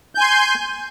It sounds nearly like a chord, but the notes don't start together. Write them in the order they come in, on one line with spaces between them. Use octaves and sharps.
G6 G#5 C6